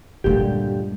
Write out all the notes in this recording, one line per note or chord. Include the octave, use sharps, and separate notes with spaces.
D2 G2 A#2 D3 G#3 G4